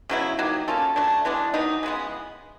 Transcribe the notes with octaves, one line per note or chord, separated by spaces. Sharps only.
C#3 F#3 B3 E4
F#3 A#3 D#4 G4
A#3 C#4 F4 A4
F#3 A3 D4
E3 G#3 B3 D4
D#3 F#3 B3 D#4
C#3 E3 G#3 B3